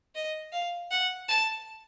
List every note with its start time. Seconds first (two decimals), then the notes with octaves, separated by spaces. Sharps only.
0.15 D#5
0.52 F5
0.91 F#5
1.29 A5